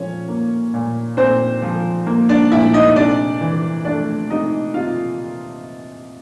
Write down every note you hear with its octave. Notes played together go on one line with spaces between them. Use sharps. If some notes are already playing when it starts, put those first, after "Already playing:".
Already playing: A#2 F3 C#4 C#5
A#3
A#2
A#2 C4 C5
F3
A#3
D4 D5
A#2 E4 E5
D#4 D#5
D#5
C3 D4 D5
E3
A3 D4 D5
C3 D#4 D#5
C3 F4 F5